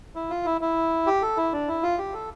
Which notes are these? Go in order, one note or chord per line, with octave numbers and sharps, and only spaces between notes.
E4
F4
E4
E4
G4
A4
E4
D4
E4
F4
G4
A4